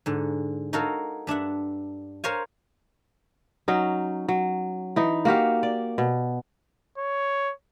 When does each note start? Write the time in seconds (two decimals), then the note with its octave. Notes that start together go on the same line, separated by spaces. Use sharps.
0.06 G#2 D3
0.73 D#4 F#4 A4 A#4 C#5 F5
1.27 G2 D4 E5 F#5
2.24 A#4 C5 C#5 F5 G#5
3.68 F#3 C#4 D#4
4.28 F#3
4.96 E3 D#4
5.25 A#3 F#4 G4 F5
5.63 D5
5.98 B2
6.98 C#5